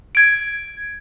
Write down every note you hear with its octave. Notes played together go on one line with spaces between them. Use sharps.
G#6 D7